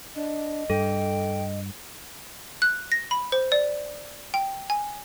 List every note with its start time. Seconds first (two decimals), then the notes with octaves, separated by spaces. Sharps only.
0.16 D4 D#5
0.70 G2 A4 G5
2.62 F#6
2.92 A#6
3.11 B5
3.32 C5
3.52 D5
4.34 G5
4.70 G#5